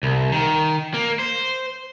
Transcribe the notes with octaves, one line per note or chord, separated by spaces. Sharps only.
C2
D#3
A#3
C5